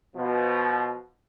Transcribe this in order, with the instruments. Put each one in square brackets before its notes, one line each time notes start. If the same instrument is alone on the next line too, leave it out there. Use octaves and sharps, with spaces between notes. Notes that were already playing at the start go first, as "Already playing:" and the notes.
[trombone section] B2 F3